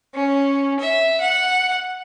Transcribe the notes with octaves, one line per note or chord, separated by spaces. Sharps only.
C#4
E5
F#5